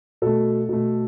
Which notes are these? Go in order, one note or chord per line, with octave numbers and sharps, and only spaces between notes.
B2 A3 A4
B2 A3